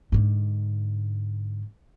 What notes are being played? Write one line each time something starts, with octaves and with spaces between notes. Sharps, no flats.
G#2 D3